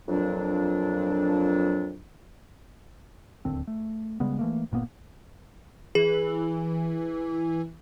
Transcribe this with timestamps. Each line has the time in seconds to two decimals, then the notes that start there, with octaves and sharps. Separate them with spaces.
0.08 F2 A#2 F#3 D4
3.45 D1 D#2 D3 C4
3.67 A3
4.20 C#3 G3 G#3 B3
4.39 E3 A3 A#3
4.71 G1 A#2 A#3 B3
5.95 E3 G#4